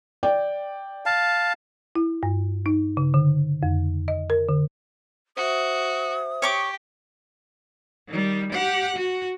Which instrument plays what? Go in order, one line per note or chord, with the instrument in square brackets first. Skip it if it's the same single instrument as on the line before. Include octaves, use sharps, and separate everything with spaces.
[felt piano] D5 G5
[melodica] F5 A5
[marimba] E4
G2
D#4
C#3
D3
F2
D#5
A#4
D3
[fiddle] F#4 [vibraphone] C5 E5 [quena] D#6
[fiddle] G4 [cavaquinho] C#5 C#6 D6
[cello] D#3 G3
G4 F#5
F#4